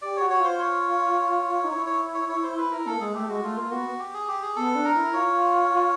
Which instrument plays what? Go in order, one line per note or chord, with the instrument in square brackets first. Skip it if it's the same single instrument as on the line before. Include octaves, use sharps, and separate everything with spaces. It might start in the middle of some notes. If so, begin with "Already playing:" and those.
[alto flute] G4 [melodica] D5
[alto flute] F#4 [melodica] C#5
[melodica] C#5
[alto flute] F4 [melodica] C5
[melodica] C#5
[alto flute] D#4
[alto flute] E4 [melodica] C#5
[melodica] C#5
C#5
C#5
C5
B4
A#4
[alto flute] A#3 [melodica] A4
[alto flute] G#3 [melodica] G#4
[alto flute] A3 [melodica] G4
[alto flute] G#3 [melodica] F#4
[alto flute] A3 [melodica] F4
[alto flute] A#3 [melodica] F4
[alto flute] B3 [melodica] F#4
[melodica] G4
G#4
G4
G#4
[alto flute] B3 [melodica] A4
[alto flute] D4
[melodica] A#4
[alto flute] E4
[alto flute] F4 [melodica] C#5